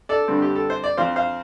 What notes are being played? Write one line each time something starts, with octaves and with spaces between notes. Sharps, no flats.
A4 D5
G2 D3 G3 C4
G4
A4
C5
D5
F2 F3 C4 C5 F5
C5 F5